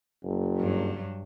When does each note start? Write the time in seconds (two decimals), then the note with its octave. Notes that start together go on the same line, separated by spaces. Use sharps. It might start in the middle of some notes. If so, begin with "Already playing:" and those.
0.24 F#1
0.57 G2 F#3